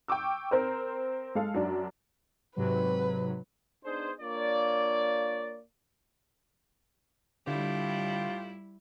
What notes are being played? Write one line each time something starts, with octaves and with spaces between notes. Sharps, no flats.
G5 C#6 D6 E6
C4 A#4 C5
G#3 A4 F5
F#2 D4
G#2 C3 F#3 B4
B3 D4 D#4 G#4 C5
A#3 D4 F4 C#5 D5
A2 D3 G3 E4 F4 G4